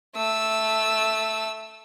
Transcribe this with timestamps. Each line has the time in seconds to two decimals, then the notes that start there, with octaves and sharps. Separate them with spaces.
0.15 A3 E6